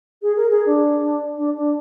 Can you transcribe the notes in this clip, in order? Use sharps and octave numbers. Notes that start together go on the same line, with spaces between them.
G#4
A#4
G#4
D4
D4
D4